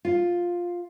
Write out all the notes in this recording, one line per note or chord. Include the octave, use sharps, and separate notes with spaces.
F4